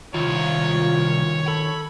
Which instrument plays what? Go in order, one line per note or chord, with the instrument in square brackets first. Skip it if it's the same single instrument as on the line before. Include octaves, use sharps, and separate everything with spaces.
[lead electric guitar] C2 [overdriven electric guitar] D#3 F3 [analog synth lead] F4 [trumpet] C#5
[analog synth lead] A4 [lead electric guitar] B5